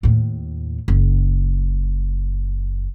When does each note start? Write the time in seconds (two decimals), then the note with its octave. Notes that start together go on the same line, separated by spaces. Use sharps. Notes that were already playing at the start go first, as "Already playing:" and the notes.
0.03 D#2 A2
0.88 F#1